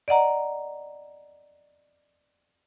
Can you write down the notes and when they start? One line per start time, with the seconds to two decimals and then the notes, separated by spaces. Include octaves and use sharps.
0.08 D5 D#5 F#5 A#5